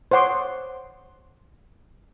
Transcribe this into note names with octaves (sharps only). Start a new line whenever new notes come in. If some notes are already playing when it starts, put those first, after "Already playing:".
C5 C#5 F#5 C6 D6 D#6